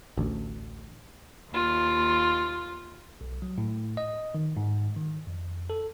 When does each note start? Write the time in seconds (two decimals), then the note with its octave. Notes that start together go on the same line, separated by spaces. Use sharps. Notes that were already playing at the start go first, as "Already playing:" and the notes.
0.17 A1 D2
1.51 D#2 F4
3.21 B1
3.42 F#3
3.58 A2
3.97 D#5
4.35 D#3
4.57 G#2
4.96 D#3
5.27 F2
5.70 A4